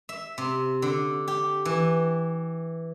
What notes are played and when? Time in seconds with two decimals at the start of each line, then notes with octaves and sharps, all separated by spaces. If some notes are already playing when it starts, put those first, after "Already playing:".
0.09 E5
0.38 C3
0.82 D3
1.28 G4
1.65 E3